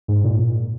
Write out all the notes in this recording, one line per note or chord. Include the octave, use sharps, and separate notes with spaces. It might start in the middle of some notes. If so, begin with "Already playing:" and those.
G#2
A#2